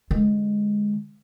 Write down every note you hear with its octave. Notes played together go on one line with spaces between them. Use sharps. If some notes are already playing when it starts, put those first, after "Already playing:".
D3 G#3